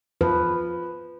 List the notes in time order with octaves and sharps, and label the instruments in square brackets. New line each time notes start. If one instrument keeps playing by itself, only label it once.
[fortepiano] F3 [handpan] B4